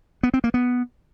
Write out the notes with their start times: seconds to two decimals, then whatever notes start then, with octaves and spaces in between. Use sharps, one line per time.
0.23 B3
0.34 C4
0.44 A#3
0.54 B3